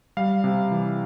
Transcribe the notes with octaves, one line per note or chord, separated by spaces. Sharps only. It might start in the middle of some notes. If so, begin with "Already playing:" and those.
G3 F5
C3
E3